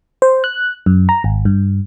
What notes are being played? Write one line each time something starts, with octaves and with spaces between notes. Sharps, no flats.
C5
F#6
F#2
A#5
G#1
G2